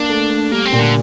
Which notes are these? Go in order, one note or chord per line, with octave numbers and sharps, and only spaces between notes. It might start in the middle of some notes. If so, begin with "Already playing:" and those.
Already playing: A#3 D4
A3
A3
G3 A#3
C4
A#2
D3